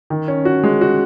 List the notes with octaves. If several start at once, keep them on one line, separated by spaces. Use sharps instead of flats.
D#3
C#4
F#4
G#3
F#4